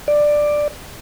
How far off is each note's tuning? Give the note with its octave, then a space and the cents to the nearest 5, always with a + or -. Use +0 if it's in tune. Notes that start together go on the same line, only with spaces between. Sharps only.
D5 +10